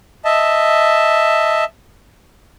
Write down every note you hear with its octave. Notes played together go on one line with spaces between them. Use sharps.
D#5 E5 A5